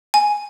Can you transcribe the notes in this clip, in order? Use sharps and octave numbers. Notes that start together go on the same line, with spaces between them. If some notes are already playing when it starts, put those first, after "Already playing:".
G#5